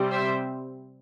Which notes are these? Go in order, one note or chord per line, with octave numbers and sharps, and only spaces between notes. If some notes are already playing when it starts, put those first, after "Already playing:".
Already playing: C3 G3 C4
C5 E5